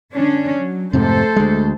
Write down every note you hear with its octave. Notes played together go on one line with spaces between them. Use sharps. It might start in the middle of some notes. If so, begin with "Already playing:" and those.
D3 C#4 D4
F#3
F2 G#2 C3 A3 A4 C5
D2 G#3